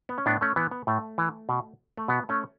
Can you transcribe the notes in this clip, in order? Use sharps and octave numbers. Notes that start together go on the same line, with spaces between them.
B3
C#4
A2 B3 D4
A3 C#4
E3 B3
B3
A2 A3
E3
B2
A3
B2 B3
A3 C#4